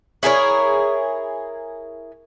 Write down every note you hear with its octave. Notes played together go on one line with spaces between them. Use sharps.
E4 G#4 A#4 C#5